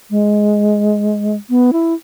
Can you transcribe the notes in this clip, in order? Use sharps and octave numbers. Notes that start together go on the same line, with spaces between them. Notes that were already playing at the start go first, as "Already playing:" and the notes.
G#3
B3
E4